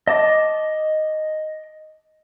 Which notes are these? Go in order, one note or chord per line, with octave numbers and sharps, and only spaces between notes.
D#5 A5 D6